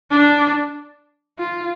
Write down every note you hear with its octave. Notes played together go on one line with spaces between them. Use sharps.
D4
F4